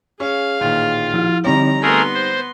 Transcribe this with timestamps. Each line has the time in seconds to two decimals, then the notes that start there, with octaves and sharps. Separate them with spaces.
0.20 C#4 G#4 F5
0.60 A1 A#2 D#3 F4
1.14 F3 E4
1.44 D3 G3 C4 D#4 G4 C#5 A#5
1.82 A3 B3 G#4 A#4 C6 A#6
2.14 C5